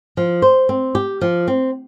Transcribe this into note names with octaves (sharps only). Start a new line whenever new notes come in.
F3
C5
C4
G4
F3
C4